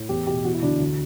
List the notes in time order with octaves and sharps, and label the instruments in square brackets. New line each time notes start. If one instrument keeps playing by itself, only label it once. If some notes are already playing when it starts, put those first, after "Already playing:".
Already playing: [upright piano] A2
E2 G4
B2 G4
E3 F#4
E4
D2 D4
D2